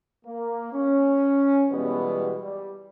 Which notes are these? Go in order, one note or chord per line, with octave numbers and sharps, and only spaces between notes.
A#3
C#4
B2 E3 G3 G#3 B3
G3